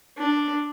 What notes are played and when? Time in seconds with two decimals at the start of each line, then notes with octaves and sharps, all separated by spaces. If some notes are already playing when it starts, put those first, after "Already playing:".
0.18 D4